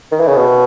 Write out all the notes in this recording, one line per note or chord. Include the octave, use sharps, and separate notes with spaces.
D#3
E3
C#3
B2